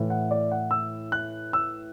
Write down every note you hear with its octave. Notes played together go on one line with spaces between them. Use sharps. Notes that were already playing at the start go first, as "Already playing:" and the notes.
Already playing: A2 E3
F#5
D5
F#5
E6
F#6
E6